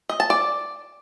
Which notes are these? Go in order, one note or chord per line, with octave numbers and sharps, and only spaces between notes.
D#5
A5
D5